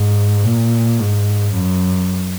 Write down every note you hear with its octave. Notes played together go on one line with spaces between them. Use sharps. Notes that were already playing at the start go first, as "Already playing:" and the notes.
Already playing: G#2
A#2
G#2
F#2